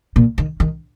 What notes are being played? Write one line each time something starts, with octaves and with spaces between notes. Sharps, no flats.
A#2
D#3
D#3